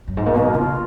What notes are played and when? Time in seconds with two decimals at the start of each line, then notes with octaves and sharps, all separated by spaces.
0.08 F#2
0.17 G#2
0.26 A#2
0.34 B2 A#3
0.54 C#3 F4